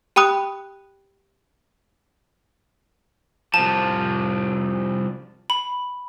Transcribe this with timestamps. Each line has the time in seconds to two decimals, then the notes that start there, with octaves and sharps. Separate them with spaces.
0.16 G4 G5 B5 D#6 F#6
3.54 C2 F3 A5
5.50 B5